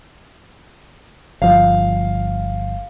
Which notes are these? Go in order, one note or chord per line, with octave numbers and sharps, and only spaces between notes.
G1 F3 F5